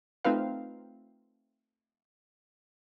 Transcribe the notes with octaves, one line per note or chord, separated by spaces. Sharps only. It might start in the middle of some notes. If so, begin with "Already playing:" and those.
A3 C4 D#4 F4 B4 F5